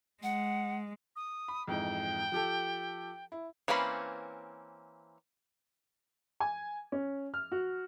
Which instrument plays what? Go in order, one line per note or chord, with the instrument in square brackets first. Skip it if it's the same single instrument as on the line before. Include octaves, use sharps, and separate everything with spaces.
[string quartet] G#3 [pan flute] F#5
[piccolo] D#6
[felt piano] B5
[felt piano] F2 G#2 E3 [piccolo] G5
[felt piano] F3 G4 A4
E4
[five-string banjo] E3 A#3 C4 C#4 B5
[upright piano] G#5
C#4
F6
F#4